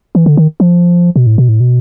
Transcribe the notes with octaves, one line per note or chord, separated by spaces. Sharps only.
E3
D3
D#3
F3
B2
A2
B2
A2
B2